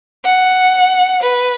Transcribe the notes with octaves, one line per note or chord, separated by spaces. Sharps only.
F#5
B4